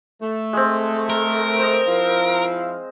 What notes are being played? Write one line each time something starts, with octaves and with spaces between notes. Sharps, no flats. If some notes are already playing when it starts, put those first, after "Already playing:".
A3
G#3 C4
A#4
C5 D#5
F3 E4 F5